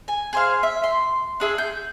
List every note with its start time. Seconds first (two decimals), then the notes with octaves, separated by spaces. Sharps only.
0.08 G#5
0.33 G#4 C5 F5
0.63 E5
0.84 C6
1.40 D4 G#4 E5
1.58 G6